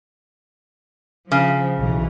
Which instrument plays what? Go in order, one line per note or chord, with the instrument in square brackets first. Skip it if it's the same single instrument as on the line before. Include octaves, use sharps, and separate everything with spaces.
[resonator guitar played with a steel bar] C#3 [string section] F3
[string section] B1 E3